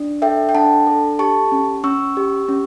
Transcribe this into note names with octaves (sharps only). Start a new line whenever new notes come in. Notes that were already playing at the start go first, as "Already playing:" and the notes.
Already playing: D4
A4 E5 G5
G5
D4 F#5 A5
A4
G4 A5 C#6
C#4
C#4 C#6 E6
G4
C#4